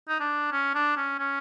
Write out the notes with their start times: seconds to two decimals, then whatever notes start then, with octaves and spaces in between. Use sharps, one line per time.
0.09 D#4
0.20 D4
0.52 C#4
0.75 D4
0.96 C#4
1.19 C#4